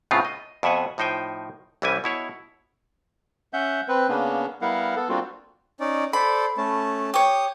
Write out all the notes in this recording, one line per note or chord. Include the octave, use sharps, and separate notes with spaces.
A2 C#3 B3 C4 F4
D#5
F2 B2 E5 F#5 G#5
A2 F3 D#4 C5 G5 G#5
C2 E3 G3 C#4 E4 G#5
B2 E4 C#5 F#5
C#4 E5 F#5 G6
C4 B4
C#3 A#3 B3 C#4 D4
G3 B3 E4 A#4 F5 F#5
B3 A4
G3 A#3 C4 D4 F4 F#4
C#4 D#4 D5
A4 C5 D5 B5
A3 C#4 A5
G4 C#5 D#6